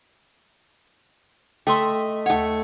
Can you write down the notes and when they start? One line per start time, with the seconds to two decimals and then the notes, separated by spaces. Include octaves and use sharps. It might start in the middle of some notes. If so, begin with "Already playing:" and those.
1.67 A3 D#5 E5 G5 C6
2.26 D#2 A3 C#5 F#5